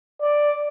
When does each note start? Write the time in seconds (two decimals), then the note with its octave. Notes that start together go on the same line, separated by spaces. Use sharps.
0.21 D5